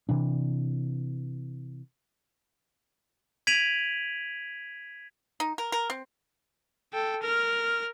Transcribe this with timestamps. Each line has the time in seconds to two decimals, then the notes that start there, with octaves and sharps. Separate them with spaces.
0.09 C3 E3 D4
3.47 G#6 B6 D7 D#7 F7 F#7
5.40 D#4
5.58 A#4
5.72 A#4
5.90 C4
6.93 A4 G5
7.23 A#4 F6